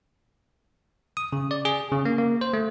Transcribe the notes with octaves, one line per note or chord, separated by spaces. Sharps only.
D#6
C#3
D5
G#4
C#3
A#3
A#3
C5
A3